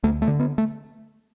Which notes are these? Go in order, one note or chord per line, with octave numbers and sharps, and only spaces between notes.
D2 A3
A3
D3
B3
A3